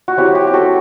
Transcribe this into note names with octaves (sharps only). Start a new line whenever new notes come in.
F#4
F#3 C4 E4 G4
G4
G4
F#4 A4